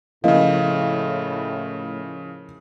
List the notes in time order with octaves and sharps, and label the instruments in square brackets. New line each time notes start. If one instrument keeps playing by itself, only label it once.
[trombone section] A2 [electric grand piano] C#3 F3 [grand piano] A#3 E4 [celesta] A#4 D#5 F5